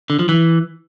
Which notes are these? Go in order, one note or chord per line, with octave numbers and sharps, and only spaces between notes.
D3
F3
E3